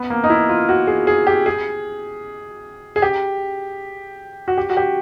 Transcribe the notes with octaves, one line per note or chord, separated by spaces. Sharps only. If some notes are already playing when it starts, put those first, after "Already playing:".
Already playing: B3
A#3
D#4
E4
F4
F#4
G#4
G#4
G4
G#4
G#4
G4
F#4
G4
F#4
G4